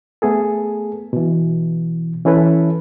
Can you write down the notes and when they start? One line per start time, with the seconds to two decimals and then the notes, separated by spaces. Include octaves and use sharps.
0.22 A3 B3 G#4 A4
1.13 B2 E3
2.25 E3 C#4 E4 A4 B4